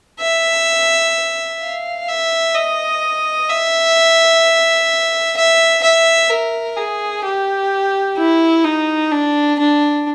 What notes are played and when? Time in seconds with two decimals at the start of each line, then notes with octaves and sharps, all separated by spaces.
0.20 E5
1.61 F5
2.08 E5
2.54 D#5
3.49 E5
5.37 E5
5.83 E5
6.30 A#4
6.77 G#4
7.25 G4
8.18 E4
8.64 D#4
9.12 D4
9.59 D4